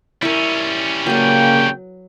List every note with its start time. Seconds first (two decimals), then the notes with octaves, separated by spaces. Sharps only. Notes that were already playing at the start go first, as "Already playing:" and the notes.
0.22 G3 C#4 E4 A#4
1.06 C#3 F#3 A#3 B4 G5